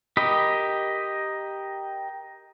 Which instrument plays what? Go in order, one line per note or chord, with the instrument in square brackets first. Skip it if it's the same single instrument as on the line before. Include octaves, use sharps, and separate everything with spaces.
[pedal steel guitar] G4 A#4 D#5 B5